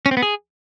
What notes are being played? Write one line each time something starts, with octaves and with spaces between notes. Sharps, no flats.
C#4
C4
B3
G#4